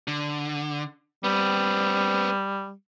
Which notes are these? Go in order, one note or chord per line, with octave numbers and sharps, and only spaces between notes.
D3
G3 B3 C4